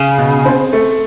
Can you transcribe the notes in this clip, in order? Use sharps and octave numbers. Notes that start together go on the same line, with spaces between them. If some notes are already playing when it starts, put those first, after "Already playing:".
Already playing: C#3
B2
C4
A3